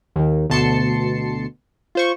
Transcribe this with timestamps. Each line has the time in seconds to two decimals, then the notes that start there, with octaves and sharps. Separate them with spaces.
0.16 D#2 D#3
0.50 D2 B2 A5 C6 C7 C#7
1.95 F4 C5 C#6